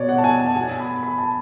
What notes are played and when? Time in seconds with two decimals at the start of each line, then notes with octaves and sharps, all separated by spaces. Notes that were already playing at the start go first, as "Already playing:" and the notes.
Already playing: B2 C#5 D5
0.09 F#5
0.18 A5
0.24 G#5
0.40 A5
0.56 B2 G#5
0.80 B5
1.03 B5
1.18 A5